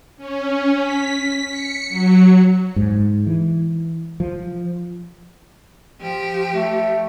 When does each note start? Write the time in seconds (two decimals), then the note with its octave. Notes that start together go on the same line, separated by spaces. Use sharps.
0.17 C#4
0.80 B6
1.49 C#7
1.89 F#3
2.76 G#2
3.27 E3
4.20 F3
6.02 F3 G4
6.54 A3